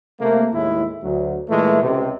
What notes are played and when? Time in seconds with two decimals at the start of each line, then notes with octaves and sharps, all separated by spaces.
0.19 C3 A3 A#3
0.52 D#2 A2 G#3 E4
1.03 D2 F#3
1.49 A#2 E3 G#3 A3
1.82 C#2 C3